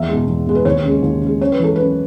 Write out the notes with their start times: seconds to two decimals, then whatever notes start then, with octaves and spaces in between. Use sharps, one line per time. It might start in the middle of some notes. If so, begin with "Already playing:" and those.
Already playing: E2 E5
0.08 B2 G#3
0.28 E2
0.47 B2 G#3
0.55 B4
0.65 D#2 C#5
0.84 C#3 G#3
1.03 D#2
1.22 C#3 G#3
1.41 F#2 C#5
1.52 B4
1.60 E3 G#3 A4
1.76 F#2 B4